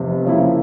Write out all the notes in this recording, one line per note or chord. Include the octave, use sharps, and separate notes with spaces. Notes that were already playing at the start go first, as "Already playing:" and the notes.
Already playing: F1 E2 C3
C#3 F3 A#3 E4